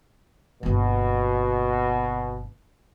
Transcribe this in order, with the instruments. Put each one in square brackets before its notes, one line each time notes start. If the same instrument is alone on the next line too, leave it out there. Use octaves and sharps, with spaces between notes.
[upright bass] G1 A#3 [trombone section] B2